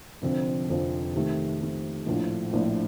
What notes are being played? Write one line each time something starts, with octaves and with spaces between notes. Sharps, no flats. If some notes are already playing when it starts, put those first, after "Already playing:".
F1 F2 D3 F3 C4
F1 F2 D3 F3 C4
C3 D#3 A3
C3 D#3 A3
A#1 A2 F3 A3 D4
A#1 A2 F3 A3 D4